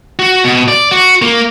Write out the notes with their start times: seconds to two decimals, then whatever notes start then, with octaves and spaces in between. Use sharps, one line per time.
0.19 F#4
0.44 B2
0.68 D5
0.91 F#4
1.22 A#3